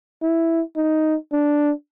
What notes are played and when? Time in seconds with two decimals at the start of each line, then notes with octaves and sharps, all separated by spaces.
0.22 E4
0.77 D#4
1.32 D4